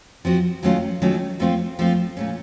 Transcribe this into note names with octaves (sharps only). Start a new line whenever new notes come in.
F3 C4 F#4
D#3 F#3 A3 C#4 F4
D#3 F#3 A3 C#4 F4
F3 A3 C4 F4
F3 A3 C4 F4
A#2 A3 C#4